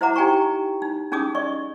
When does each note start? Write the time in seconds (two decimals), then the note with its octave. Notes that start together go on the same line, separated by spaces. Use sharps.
0.01 E4 C5 E5 F#5 A#5 D6
0.16 D#4 G4 G5 G#5 A#5 C#6
0.82 D#4
1.12 C#4 D#4 G#4 D6 D#6
1.35 D5 D#5 C#6